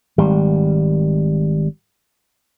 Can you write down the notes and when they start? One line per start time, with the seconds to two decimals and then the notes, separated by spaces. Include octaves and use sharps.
0.18 G#1 G3